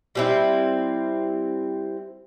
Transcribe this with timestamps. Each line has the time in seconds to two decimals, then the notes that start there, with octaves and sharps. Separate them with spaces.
0.15 G3 C4 E4